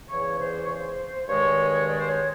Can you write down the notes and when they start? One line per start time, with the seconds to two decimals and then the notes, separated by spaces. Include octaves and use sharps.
0.08 E2 C#3 E3 C#5
0.39 C5
0.64 C#5
0.69 C5
1.28 G2 D#3 G#3 C#5
1.87 D5
1.99 C5
2.07 C#5